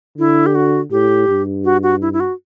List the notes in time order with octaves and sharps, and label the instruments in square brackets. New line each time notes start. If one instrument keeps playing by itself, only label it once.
[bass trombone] D3 [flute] E4
[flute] G4
F#4
[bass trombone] A2 [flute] G4
[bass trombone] G2
[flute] F#4
F#4
E4
E4
F#4